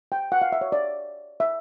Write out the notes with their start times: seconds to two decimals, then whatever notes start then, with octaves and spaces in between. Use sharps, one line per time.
0.12 G5
0.32 F#5
0.42 F5
0.52 E5
0.61 C#5
0.72 D5
1.40 E5